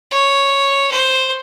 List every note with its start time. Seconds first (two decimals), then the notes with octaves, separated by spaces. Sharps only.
0.11 C#5
0.91 C5